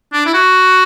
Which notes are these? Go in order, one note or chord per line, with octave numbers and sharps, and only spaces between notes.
D4
E4
F#4